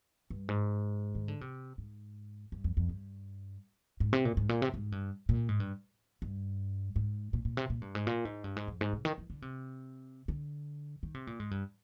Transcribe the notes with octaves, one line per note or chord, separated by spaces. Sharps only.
G2
G#2
D#3
D3
C3
G#2
G2
F2
F2
G2
G#2
C3
A#2
G#2
A#2
C3
G#2
G2
A#2
G#2
G2
G2
G#2
A#2
A#2
C3
A#2
G2
G#2
A#2
G#2
G2
G#2
F2
G#2
C3
D#3
F3
D3
C3
D3
D#3
C3
A#2
G#2
G2